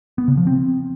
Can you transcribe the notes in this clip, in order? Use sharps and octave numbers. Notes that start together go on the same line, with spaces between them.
B3
C#3
F3
C4